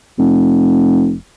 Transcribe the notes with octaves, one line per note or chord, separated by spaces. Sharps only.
F1